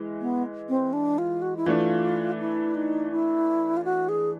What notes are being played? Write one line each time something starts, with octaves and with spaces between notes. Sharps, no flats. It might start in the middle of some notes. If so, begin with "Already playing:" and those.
Already playing: E3 G#3
B3
C4
D4
F4
F#4
E4
E3 A3 D4 F4
E4
D#4
E4
F4
F#4
G#4